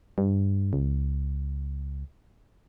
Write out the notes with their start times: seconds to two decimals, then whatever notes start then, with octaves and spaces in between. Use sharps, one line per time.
0.18 G2
0.73 C#2